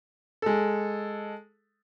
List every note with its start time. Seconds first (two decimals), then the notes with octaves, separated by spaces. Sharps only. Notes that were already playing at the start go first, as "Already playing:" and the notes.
0.42 G#3 A4